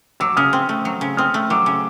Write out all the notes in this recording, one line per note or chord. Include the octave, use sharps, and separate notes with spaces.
F#3 D6 E6
C#3 D#6 F6
C4
A3
F#3
C#3
C4 D#6 F6
A3
F#3 D6 E6
C#3